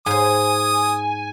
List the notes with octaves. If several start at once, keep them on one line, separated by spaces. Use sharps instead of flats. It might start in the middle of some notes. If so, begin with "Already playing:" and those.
G#2 C5 G#5 D#6